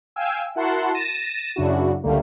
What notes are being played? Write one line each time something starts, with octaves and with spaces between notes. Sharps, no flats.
F5 G5 G#5 E6
E4 F#4 A#4 F#5 A5 C6
A6 A#6 D#7 E7
F#2 C#3 D4 E4 F#4
C#2 D3 G3 A3 A#3